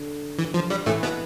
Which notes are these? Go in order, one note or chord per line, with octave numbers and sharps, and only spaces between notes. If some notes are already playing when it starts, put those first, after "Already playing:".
Already playing: D3
E3
F3
G2 G3
A2 E3 A3
B2 B3